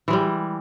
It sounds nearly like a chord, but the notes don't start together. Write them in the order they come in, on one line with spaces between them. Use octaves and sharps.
E3 G#3 G3